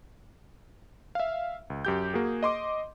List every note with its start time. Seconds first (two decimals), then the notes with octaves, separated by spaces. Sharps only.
1.15 E5 F5
1.70 C#2
1.85 F#2 G4 G6
2.14 A#3 F#4 G#4
2.43 D#5 C6 D6